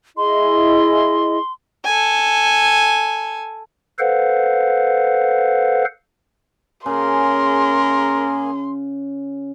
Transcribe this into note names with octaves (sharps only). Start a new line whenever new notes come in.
E4 G#4 D#5 C6
A4 G#5
A4 B4 C5 F5 F#5
C#3 A#3 G#4 A#4 C6